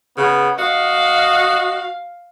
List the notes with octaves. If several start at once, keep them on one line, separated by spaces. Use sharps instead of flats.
C#3 B3
F#4 D#5 F5